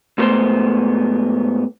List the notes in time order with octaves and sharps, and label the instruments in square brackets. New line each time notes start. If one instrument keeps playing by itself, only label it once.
[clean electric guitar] G#2 G3 A3 B3 C5 C6